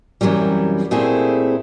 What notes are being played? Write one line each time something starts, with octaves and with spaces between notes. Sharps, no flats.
F#2 C3 D#3 E3 F#3 G3
A#2 A3 C4 E4 G4 G#4